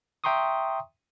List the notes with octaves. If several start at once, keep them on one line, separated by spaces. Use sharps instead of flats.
E5 G5 A#5 C6 C#6 D#6